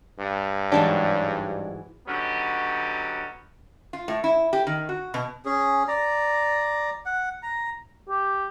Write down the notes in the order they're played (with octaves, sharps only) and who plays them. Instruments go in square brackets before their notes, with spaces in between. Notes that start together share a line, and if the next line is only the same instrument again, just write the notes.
[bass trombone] G2
[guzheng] G#2 E3 F#3 [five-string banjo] G#3 D4 G4
[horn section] D3 F#3 B3 C#4 D#4 G4
[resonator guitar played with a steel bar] F4
A2
E4
G4
D#3
F#4
B2
[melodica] C#4 G#4
D5 A#5
F#5
A#5
[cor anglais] G4